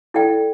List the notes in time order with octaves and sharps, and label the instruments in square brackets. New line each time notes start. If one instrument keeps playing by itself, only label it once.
[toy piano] E4 A4 D5 G5